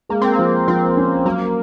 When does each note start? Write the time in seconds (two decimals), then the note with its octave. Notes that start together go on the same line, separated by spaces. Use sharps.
0.09 G#3 A#3
0.22 C4
0.33 A#3
0.39 F3
0.68 F3 C4
0.97 C#4
1.25 F#3 A#3